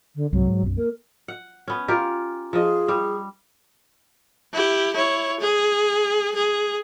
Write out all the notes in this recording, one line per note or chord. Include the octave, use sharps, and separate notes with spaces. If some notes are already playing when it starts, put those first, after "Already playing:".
D3
C2 G#2 F#3
G#2
B1 F#2
A#3 A#4
F#5
B3 C#4
F4 G4 A#4
F3 G#4 D#5
G3
E4 G4
E4 C#5
G#4
G#4